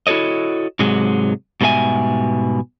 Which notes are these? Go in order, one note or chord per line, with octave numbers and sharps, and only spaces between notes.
E4 F#4 A4 C#5 D#5
G#2 C3 F#3 G#3
G#2 B2 G3 A4 E5 G#5